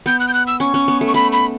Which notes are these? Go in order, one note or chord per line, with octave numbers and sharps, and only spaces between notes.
B3 G6
F#6
G6
F#6
E6
C#4 C#6
C#4
B3
A3
C#6
A3 B5
B5